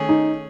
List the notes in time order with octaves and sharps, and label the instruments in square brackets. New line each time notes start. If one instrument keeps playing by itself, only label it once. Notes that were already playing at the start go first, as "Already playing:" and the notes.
Already playing: [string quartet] D#3 A3 C#4 G#4
[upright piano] D#4